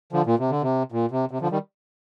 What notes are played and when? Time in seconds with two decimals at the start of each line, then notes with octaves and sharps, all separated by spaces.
0.13 D3 F3
0.26 A#2
0.39 C3
0.51 D3
0.62 C3
0.92 A#2
1.11 C3
1.31 C3
1.41 D3 F3
1.51 D#3 G3